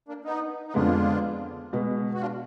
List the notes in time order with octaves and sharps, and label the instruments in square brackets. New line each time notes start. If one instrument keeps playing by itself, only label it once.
[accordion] A#3 D4
B3 D#4
D#4
[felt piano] F2 D3 G#3 B3 [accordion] D4 F4
[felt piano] B2 G#3 B3
[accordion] F#4
D4 F4